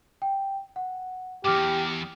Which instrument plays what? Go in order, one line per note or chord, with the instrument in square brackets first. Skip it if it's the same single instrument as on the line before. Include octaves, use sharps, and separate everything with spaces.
[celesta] G5
F#5
[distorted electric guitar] E2 G#2 [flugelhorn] G4 [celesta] D6 F6